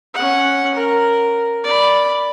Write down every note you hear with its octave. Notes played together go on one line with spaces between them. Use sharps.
C#4 F#5
A#4
D5 B5